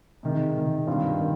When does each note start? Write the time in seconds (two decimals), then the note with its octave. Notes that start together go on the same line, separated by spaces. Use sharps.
0.23 C3 D#3 G#3
0.55 C3 D#3 G#3
0.87 G2 D#3 G3 C4 F4
1.21 D#3